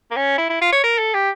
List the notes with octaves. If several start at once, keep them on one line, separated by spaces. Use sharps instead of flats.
A#3
C#4
E4
E4
F4
C#5
A#4
A4
G4